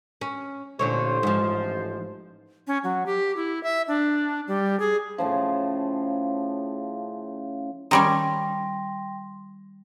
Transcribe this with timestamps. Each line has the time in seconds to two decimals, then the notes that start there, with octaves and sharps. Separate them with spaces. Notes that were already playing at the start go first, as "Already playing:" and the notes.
0.21 C#4
0.79 A1 A#2 D3 C5 C#5
1.23 G#2 F3
2.67 C#4
2.84 F#3
3.06 G4
3.36 E4
3.63 E5
3.88 D4
4.47 G3
4.80 G#4
5.18 A2 C#3 F3
7.91 D#3 G3 C#4 G5 C6 A#6